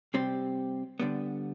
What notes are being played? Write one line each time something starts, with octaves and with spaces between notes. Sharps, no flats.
C3 G3 C4 G4
D3 G3 B3